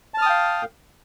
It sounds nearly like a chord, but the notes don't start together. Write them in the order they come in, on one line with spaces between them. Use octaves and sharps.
A5 F6 D#6 G5 F5